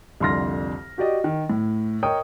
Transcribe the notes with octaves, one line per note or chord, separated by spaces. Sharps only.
C2 F2 D3 C6 F6 A#6
F#4 G4 D5 D#5
D#3
A2
A#4 C#5 D#5 G5 D#6